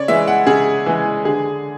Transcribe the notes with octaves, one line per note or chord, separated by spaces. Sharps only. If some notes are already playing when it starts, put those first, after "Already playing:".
Already playing: C#3 C#5 D5
E3 G#3 E5
F#5
C#3 G#4
E3 G#3
D3 G#4